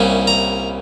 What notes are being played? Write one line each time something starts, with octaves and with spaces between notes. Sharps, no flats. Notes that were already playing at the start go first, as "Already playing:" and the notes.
Already playing: C2 A#2 G3 C#4 E4
A#5